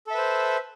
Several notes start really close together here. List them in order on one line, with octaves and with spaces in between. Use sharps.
A4 E5 B4 C5